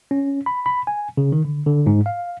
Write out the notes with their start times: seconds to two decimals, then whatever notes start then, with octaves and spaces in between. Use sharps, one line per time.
0.11 C#4
0.46 B5
0.66 B5
0.87 G#5
1.17 C#3
1.32 D#3
1.45 D3
1.66 D3
1.86 G#2
2.06 F5